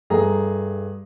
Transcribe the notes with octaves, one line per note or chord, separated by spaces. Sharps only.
G2 A3 G#4 A#5